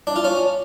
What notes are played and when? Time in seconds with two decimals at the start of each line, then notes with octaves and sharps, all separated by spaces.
0.07 D4
0.16 F4
0.24 C#4